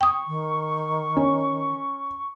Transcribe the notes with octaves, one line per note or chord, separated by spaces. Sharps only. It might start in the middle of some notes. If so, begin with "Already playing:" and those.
G5 C#6 D#6
D#3
C#4